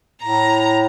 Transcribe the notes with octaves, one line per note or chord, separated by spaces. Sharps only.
A2 A#5